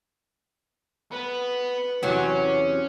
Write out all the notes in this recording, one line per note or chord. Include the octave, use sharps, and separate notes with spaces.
B3 B4
E2 C3 F#3 C#4